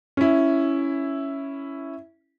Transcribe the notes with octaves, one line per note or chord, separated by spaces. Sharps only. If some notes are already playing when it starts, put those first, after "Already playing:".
C#4 E4